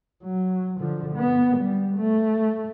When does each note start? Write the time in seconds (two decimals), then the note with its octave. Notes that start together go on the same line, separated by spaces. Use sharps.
0.23 F#3
0.80 D3 F3
1.16 B3
1.57 G3
1.97 A3